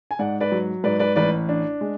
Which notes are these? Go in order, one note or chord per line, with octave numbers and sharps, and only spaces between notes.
G#5
G#2 D5 F#5
B4 D5
F#3
G#2 B4 D5
B4 D5
A1 B4 D5
D4
G#3